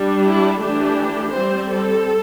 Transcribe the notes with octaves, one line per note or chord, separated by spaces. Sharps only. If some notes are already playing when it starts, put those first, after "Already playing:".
Already playing: G3 D4
E4
E3 A3 D4 G4
G3 C4 C5
A4